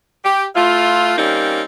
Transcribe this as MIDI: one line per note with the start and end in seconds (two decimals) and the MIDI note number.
0.24 0.44 67
0.56 1.12 57
0.56 1.12 64
0.56 1.12 65
1.16 1.62 55
1.16 1.62 58
1.16 1.62 60
1.16 1.62 61
1.16 1.62 63